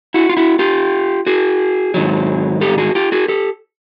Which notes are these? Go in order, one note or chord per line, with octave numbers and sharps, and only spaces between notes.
E4 F#4
F4
E4 F#4
F4 G4
F#4 G#4
G#2 D#3 F#3
G4 A4
F#4 G#4
F4 G4
F#4 G#4
G4 A4